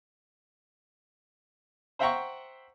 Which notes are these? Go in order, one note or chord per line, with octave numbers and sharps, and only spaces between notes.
C5 E5 F#5 G5 A#5 C#6